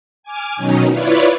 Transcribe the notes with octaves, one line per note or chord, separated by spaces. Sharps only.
G#5 D6 F6
B2 D#3 F#3 C#4 D#4
E4 F4 B4 C#5 D5